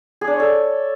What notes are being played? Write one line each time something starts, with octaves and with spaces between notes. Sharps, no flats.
G#4
D4
C#5
A4